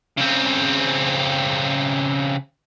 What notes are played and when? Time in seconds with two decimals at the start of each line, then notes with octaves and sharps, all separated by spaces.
0.17 C#3 C4